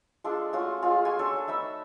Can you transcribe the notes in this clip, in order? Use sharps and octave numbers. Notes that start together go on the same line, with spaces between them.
G#3 D4 F4 A4
A3 C#4 F4 F#4
G#3 F4 G#4
F#4 G#5 C6
D4 A4 C#5
A3 D#4 E5 B5